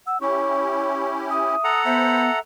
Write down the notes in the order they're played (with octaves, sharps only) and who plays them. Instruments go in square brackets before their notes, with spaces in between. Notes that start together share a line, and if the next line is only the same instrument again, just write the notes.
[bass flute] F#5 [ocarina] E6
[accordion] C#4 E4 G4 [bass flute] C#5 [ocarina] C#6
[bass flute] E5 [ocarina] D#6
[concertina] A4 F#5 A#5
[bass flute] B3 [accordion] C5 B5 [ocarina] E5